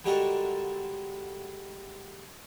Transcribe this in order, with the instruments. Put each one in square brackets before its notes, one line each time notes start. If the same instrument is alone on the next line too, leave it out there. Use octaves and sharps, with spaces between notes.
[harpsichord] D3 G3 G#3 F#4 A4 A#4